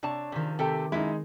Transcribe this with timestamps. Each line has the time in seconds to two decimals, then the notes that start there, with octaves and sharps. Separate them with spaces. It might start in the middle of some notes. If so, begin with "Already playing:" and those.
0.03 C3 D4 C#5 A5
0.32 C3 D#3 F3 C4 G#4
0.59 C3 A3 G4 A4 G5
0.92 F#2 G#3 D#4 E4